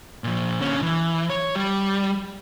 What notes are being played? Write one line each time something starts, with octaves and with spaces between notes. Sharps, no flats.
A#2 F3
D3 C#4
E3
C#5
G3